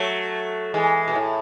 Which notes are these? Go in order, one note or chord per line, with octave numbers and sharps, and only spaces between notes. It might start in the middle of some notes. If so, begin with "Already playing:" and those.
Already playing: F#3 A3
E3 G#3
B2
A2